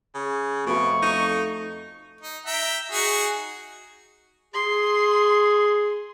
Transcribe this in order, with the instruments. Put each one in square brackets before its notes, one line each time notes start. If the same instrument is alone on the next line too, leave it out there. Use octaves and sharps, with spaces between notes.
[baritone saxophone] C#3
[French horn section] F2 A3 [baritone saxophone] B2 [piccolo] C#6
[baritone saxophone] D#4
[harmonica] D#4
E5 G5 A#5
D#4 F#4 G#4
[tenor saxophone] G#4 [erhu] C6